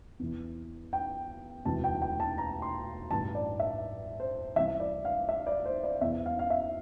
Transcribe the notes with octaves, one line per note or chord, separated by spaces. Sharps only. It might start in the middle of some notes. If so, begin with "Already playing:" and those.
E2 E3
G5
E1 D2 C3 E3 A5
G5
G5
A5
A#5
C6
A1 G2 E3 A5
D5
E5
C5
C2 C3 E3 E5
D5
F5
E5
D5
C5
D5
E2 E3 E5
F5
F5
E5